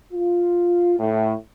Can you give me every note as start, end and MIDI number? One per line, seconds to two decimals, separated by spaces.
0.13 0.95 65
1.00 1.33 45